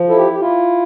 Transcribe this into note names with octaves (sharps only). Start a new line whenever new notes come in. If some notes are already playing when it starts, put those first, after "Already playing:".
Already playing: F3
E4 A4
G4
G4
E4 F4